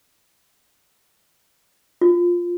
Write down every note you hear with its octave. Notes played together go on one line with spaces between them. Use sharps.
F4